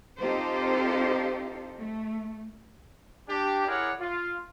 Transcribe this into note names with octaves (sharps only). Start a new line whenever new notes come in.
C4 D#4 F4 G4 A4 C5
A3
D4 G4
E4 G#4 A#4 C#5 D5 F#5
F4